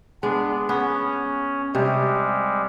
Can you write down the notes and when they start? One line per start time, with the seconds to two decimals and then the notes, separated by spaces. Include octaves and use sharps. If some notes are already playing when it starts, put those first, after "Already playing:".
0.23 G#3 B3 D4
0.69 B3 C#4
1.75 C3 G3 G#3